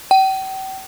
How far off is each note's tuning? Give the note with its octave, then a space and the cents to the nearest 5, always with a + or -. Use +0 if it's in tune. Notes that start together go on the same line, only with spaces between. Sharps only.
G5 -40